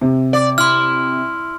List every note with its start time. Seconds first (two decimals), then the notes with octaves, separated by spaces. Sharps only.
0.01 C3
0.33 D5
0.58 E4 C6 F6